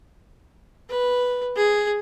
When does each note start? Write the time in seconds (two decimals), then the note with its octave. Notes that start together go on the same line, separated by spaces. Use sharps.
0.90 B4
1.56 G#4